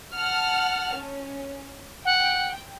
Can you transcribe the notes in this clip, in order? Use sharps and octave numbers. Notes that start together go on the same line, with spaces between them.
F#5 A5 F6
C#4
F#5 G5